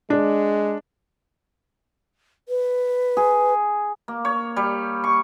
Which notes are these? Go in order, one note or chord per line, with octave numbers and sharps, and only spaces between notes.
G#3 D4
B4
G#4
A#3
C#5
G3
C#6